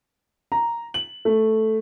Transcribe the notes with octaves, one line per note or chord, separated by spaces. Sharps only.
A#5
F#7
A3